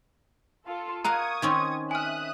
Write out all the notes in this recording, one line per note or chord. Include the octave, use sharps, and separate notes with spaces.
F4 A4
A#4 F5 F#5 A#5 C#6 D#6 G#6
D#3 C4 C#4
E5 G#5 D#6 F6 F#6